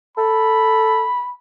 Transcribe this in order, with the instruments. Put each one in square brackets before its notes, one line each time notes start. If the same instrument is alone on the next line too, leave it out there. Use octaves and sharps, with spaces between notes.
[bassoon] A4 [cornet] B5